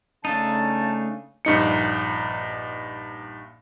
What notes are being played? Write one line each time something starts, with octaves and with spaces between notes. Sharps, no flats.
C#3 A3 D4 D#4 A5
A#1 G2 D#4 C#7